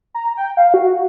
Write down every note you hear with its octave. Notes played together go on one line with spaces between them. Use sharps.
A#5
G5
F5
F#4